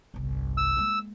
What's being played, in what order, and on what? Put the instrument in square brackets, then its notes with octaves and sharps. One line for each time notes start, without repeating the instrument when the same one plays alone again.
[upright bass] G1 C2
[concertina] E6
[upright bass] G#3 A#3